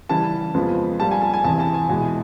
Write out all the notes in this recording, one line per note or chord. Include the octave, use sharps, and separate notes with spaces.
C#3 E3 G3 A5
F2 C#3 F3 G#3 B3
A#2 G3 A#3 A5
G#5
A5
G#5
E2 C3 E3 A5
A5
G#5
E2 B2 G#3